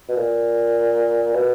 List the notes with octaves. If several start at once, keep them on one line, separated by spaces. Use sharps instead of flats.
B2
A#2
B2